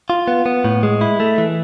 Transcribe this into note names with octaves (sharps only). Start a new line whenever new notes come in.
F4
B3
B3
A2
G#3
E4
A3
E3